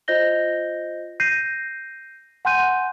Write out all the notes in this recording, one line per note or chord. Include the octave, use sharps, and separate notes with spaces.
F4 C5 D#5 G6 A#6 G7
G6 A#6 C7 D#7
F#5 G#5 C6 F#6 G6 D#7